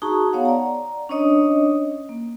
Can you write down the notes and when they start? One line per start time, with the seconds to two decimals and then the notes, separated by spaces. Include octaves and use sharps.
0.02 D#4 F#4 G#4 A5 A#5 C#6
0.33 B3 C#5 F5 F#5
0.45 D5 A#5
1.09 C#4 D4 C#5 D#5 D#6
2.09 A#3